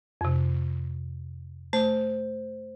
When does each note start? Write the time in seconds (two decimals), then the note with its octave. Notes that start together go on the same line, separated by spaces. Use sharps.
0.21 F2 C3
1.73 A3 C5